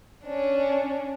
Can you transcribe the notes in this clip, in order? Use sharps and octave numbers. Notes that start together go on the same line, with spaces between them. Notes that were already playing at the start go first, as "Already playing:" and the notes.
C#4 D4